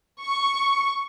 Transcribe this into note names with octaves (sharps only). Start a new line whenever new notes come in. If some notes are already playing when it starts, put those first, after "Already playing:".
C#6